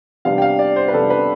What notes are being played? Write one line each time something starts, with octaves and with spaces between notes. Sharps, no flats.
C3 G3 B3 D4 F5
G5
F5
D5
C5
B4
C3 G3 B3 D4 A4
B4